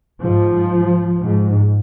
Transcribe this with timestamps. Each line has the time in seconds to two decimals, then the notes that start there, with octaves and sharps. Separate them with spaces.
0.22 G#2 F3
1.22 G#2